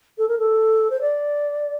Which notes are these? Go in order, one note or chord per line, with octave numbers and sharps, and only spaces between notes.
A4
A#4
A4
C5
D5